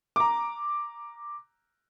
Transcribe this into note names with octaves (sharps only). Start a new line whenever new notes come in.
A#5 D6